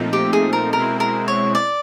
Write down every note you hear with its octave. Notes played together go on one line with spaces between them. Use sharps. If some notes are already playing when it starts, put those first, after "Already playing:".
Already playing: A#2 F3 A3 C4 D#4
G4
G#4
A#4
B2 G#3 C4 E4 A#4
A#4
C#5
D5